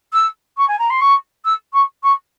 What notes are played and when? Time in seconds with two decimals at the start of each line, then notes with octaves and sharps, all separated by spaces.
0.13 E6
0.57 C#6
0.68 G#5
0.79 A#5
0.90 C6
1.01 C#6
1.45 E6
1.73 C#6
2.03 C#6